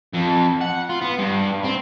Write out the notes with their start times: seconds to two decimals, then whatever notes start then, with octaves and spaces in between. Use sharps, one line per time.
0.14 F2
0.61 F#5
0.90 F4
1.02 B3
1.19 G2
1.64 C4